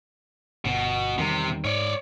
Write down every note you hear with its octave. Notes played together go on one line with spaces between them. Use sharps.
G1 B2
E2 C3 D#3 G3
G#2 C#5 D5